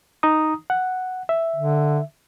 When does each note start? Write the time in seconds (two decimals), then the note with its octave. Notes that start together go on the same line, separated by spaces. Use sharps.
0.23 D#4 A#5 D#6
0.70 F#5
1.29 E5
1.56 D3